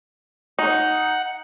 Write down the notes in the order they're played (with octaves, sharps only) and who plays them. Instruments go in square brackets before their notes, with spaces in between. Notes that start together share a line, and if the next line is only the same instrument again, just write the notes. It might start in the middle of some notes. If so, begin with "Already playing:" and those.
[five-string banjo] D#4 [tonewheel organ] F#5